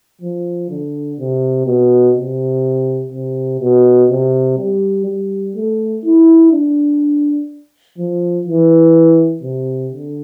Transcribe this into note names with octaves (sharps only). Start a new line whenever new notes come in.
F3
D3
C3
B2
C3
C3
B2
C3
G3
G3
A3
E4
D4
F3
E3
C3
D3